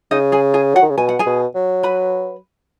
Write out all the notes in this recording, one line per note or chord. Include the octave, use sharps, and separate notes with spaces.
C#3 D#4 D#5
G#4 G#5
G#4 G#5
F#3 F#4 F#5
D#3
C#3
B2 G#5
F#5
G#4 G#5
B2
F#3
B4 B5